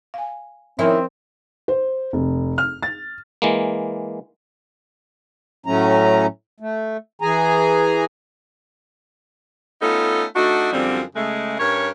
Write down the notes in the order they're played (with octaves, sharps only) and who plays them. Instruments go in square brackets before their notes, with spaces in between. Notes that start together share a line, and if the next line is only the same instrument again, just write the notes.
[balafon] F5 G#5
[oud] D#3 C#4 E4 [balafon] F3 A#4 C5 [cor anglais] C4
[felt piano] C5
F1
F6
A6
[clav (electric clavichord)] E3 G#3 A#3
[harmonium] A2 F#3 A3 C#4 A#5
A3
E3 G#4 G#5 A#5
[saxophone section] A3 B3 C#4 D#4 F4 A4
A3 D4 D#4 F#4
F#2 D3 F3 G3 C4
C#3 G#3 A3
G2 C#4 A#4 C#5